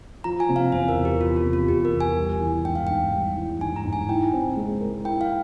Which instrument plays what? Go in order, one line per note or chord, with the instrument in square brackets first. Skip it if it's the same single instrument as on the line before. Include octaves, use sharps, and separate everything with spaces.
[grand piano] F3 [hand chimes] A#5
[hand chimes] G#5
[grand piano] C3
[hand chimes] F5
[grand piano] E2 [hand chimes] C5
[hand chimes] A#4
[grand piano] E2
[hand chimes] G4
[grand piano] F3 [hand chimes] F4
[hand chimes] F4
[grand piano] C3
[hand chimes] F4
[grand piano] E2 [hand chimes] G4
[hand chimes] A#4
[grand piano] E2
[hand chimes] G#5
[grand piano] G3
E3
[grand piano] G#2 [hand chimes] G5
[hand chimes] F5
[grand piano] G#2 [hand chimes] G5
[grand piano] G3
E3
[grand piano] G#2 [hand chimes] G#5
[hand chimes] A#5
[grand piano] G#2
[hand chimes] G#5
[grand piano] E4 [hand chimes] G5
[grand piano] C4
G#3
A#4
[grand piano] E4 [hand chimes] G5
[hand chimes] F5